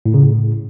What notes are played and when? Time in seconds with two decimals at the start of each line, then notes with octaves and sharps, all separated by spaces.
0.06 A2
0.14 C#3
0.23 A2